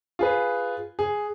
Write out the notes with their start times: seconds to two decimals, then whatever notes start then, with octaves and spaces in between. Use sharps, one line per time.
0.19 F4 G#4 B4
0.99 G#4